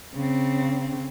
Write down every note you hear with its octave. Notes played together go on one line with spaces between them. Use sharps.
C#3 C4